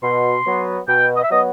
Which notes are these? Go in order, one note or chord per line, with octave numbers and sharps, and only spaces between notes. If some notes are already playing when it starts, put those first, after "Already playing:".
B2 C6
F#3 B3
B2 G5
D#5
E5
F#3 B3 D#5